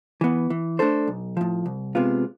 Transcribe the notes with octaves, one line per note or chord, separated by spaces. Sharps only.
E3 B3
E3
A3 D4 A4 C5
B1
A2 F3
C2
C3 G#3 B3 F4